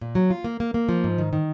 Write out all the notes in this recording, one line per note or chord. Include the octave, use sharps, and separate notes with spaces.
A#2
F#3
F4
A#3
A#3
A#3
F3
G#2
D#3
D#3